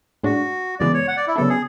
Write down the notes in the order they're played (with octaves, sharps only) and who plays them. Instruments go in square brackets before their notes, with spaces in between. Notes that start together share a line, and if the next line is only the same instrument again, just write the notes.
[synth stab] A2 G#3 D4 [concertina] F#4
[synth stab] F#2 C#3 E3 G#3 B3 [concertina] D5
[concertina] C#5
F#5
D5
E4
[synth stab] C#3 F#3 B3 D4 [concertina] A4
[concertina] G#4